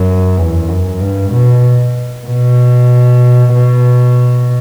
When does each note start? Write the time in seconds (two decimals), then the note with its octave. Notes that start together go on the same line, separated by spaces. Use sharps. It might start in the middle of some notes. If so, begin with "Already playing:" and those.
Already playing: F#2
0.38 E2
0.69 F#2
1.00 G2
1.32 B2
2.27 B2
3.54 B2